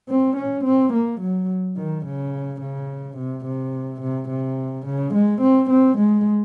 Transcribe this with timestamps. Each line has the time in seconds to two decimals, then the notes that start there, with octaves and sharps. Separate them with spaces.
0.09 C4
0.37 C#4
0.64 C4
0.93 A#3
1.21 F#3
1.77 D#3
2.05 C#3
2.61 C#3
3.17 C3
3.45 C3
4.01 C3
4.29 C3
4.86 C#3
5.14 G#3
5.41 C4
5.70 C4
5.97 G#3